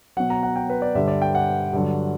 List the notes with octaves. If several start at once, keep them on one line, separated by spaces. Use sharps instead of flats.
B2 F#3 F#5
A#5
F#5
G5
B4
D5
G2 D3 G3 E5
D5
G5
F#5
G2 D3 F#3